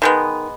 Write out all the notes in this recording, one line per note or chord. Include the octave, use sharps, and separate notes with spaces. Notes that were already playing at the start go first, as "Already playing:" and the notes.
D#3 G#3 B3